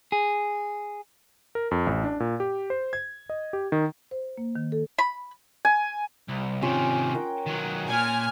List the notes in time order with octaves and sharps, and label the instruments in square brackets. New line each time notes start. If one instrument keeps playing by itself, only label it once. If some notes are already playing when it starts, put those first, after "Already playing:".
[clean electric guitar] G#4
[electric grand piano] A#4
F2
A1
D4
A#2
G4
C5
G#6
D#5
G4
D#3
[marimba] C5
A#3
D#3
A4
[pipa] B5
[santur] G#5
[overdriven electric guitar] C2
[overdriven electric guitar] C3 D#3 [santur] C#4 F4 G#4
[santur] A#4 F#5 G5
[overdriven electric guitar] D#3 F#3
[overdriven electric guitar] A#2 [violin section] G#5 F6